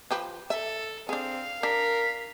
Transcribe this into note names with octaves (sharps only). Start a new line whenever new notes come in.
F3 G4 B4
A4 E5
C4 D4 G#4 F5
D4 A#4 B6